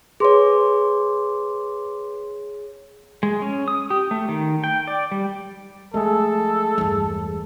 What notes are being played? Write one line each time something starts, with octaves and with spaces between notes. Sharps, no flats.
G#4 B4 C#5 C6 D6
G#3
C#4
D#6
G4
A3
D#3
G5
D5
G3
F3 G#3 A3 G#4 A4
G1 E2